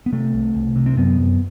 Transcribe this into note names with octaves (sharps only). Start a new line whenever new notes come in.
B3
C3 A3
C2
C2
C3
C4
F#2 B3
F#2